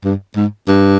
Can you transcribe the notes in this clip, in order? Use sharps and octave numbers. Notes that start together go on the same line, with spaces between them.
G2
G#2
G2